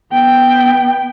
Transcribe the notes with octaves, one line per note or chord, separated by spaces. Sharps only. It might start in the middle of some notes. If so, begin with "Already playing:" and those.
B3 G5